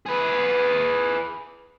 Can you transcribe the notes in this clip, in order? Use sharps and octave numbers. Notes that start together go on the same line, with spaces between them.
G#4 B4